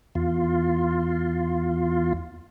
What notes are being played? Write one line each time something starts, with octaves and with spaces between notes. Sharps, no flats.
E2 F4